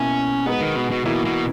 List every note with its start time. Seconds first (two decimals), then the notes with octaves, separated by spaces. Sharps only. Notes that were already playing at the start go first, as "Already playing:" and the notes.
Already playing: B2 A#3 C#4 E4
0.46 G#3 B3 D#4 F#4 B4
0.61 D#3
0.76 B2
0.90 B2
1.05 B2 E3 A#3 E4 B4
1.25 B2